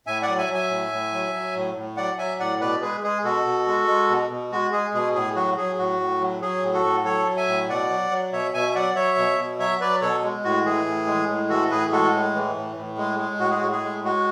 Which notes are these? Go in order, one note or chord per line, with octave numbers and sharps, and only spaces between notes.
A2 E5 G#5
D5 F#5
F#3
E5 G#5
F#3
E5 G#5
A2
A2
F#3
F#3
A2
A2
F#3 D5 F#5
F#3 E5 G#5
A2 D5 F#5
B2 B4 D5
G#3 G#4 B4
G#3 G#4
B2 F#4 A4
B2
G#3
G#3
B2
B2
G#3 F#4
G#3 G#4
B2 G#4
A2 G#4
F#3 F#4
F#3 G#4
A2 F#4
A2
F#3
F#3 G#4
A2
F#4 A4
A2
F#3 A4 C#5
F#3
E5 G#5
A2
B2 D5 F#5
F#3
F#3
B2 C#5 E5
B2 E5 G#5
E5
F#3 D5 F#5
F#3 C#5 E5
B2
B2
F#3 C#5 E5
F#3 B4 D5
B2 A4 C#5
G#3
A2 F#4
E3 G#4
A2
G#3
A2
E3 F#4 A4
A2 G#4 B4
G#3 F#4 A4
A2
E3
A2
A2
G#3
G#3
A2 F#4
G#4
A2 F#4
G#4
G#3
G#3 F#4